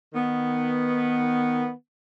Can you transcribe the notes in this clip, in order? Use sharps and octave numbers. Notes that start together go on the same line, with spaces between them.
D#3 B3